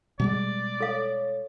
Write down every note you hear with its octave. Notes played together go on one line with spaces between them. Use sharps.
B2 G3 G#3 D5
A4 C#5 F5